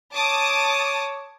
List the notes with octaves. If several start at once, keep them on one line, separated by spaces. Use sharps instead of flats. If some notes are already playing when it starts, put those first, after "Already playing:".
C#5 A5 D6 D#6